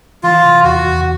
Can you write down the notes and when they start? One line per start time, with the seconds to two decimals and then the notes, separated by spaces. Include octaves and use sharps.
0.23 E3 F4
0.44 C3
0.64 E2 F#4
0.85 E2